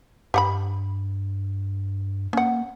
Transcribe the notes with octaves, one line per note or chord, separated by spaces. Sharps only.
G2 G4 F#5 B5
A#3 C#4 F#5